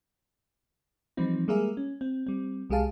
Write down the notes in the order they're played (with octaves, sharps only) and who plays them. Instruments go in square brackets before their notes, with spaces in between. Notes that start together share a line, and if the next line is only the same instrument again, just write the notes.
[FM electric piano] E3 F3 G3 C4 D#4
G3 G#3 A#3 G#4 A#4 E5
C#4
C4
G3 C4
C2 G#3 G4 G#4 F5 A5